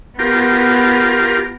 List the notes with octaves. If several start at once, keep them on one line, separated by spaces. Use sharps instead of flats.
B3 F4 G4 A#4